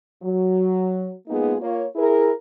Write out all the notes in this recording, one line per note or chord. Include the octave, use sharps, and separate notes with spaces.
F#3
G#3 A#3 B3 D#4 F4 G#4
A#3 F4 C#5
E4 G#4 A#4